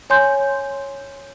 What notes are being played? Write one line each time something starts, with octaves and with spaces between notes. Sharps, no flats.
C#5 G#5 C6 G6